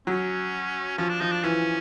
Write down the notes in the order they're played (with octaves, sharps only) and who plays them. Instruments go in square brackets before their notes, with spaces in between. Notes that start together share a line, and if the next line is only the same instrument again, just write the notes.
[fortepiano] F#3 [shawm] C#4
[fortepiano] F3 [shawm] C#4
[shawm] D4
[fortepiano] F3 [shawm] D#4
[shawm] D4
[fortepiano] E3 [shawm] C#4